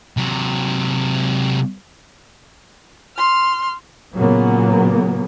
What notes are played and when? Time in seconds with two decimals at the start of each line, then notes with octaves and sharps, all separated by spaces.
0.17 C3 F#3
3.17 C6 F6
4.16 A#2 C#3 F#3 A#3 B3